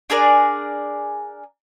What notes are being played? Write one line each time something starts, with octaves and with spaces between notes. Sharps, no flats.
D4 G#4 A#4 D5